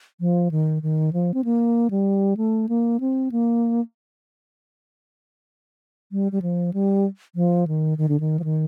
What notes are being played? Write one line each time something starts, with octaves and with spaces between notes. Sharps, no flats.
F3
D#3
D#3
F3
C4
A#3
G3
A3
A#3
C4
A#3
G3
G3
F3
G3
F3
D#3
D#3
D3
D#3
F3
D#3